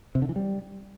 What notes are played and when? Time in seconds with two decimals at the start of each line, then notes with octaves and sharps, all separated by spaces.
0.15 C3
0.22 D3
0.29 E3
0.36 G3